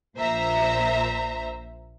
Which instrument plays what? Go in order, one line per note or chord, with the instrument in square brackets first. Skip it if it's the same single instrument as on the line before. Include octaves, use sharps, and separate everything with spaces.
[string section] A#1 A#2 C5 E5 A#5